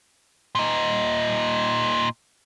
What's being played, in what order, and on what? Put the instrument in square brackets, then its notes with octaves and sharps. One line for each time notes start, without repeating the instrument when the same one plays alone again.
[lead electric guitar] A#2 D#4